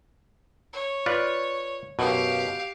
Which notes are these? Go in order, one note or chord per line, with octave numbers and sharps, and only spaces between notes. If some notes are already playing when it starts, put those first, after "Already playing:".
C#5
F4 B4 D5
F#2 B2 G4 F5